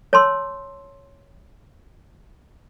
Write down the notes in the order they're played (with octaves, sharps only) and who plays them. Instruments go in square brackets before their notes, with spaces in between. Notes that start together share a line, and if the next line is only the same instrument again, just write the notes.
[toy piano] C#5 A5 C6 E6